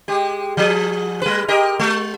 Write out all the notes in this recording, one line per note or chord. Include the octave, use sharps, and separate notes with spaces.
G#3 G4
F3 G#4
G3 B4
G4 A#4 D#5
G#3